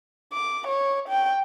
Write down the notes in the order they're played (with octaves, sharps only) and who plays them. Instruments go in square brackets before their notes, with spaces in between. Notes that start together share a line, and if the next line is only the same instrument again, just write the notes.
[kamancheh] D6
C#5
G5